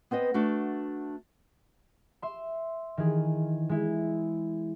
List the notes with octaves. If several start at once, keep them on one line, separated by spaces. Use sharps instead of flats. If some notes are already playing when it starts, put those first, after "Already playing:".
B3 C4 B4 D#5
A3 D4 F#4
E5 C6
D#3 E3 G#4
G#3 E4